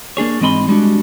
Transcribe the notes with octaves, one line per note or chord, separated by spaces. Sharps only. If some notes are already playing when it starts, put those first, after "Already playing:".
A#3 D4 G#4 C#5
G#2 E3 C4 D#5 B5 C6
G3 G#3 C#4 D4 F#4